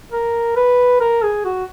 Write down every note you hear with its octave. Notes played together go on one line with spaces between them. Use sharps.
A#4
B4
A#4
G#4
F#4